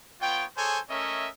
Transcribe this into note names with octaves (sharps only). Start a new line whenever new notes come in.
B3 F4 C#5 G5
G#4 A4 C5 C#5 G#5
A3 C#4 A#4 C#5 D#5 E5